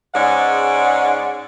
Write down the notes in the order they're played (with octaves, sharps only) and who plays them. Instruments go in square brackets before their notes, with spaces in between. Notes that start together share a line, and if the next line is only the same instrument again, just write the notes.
[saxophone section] G#2 G#3 C#4 D5 F#5